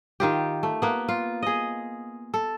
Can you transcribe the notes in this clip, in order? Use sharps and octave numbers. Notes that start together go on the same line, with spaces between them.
D#3 F4 G4
A3
A#3 B3
F4
G#4 D#5
A4